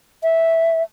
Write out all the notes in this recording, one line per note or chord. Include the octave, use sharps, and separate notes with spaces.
E5